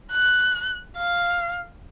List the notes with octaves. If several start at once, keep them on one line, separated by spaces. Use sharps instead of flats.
F#6
F5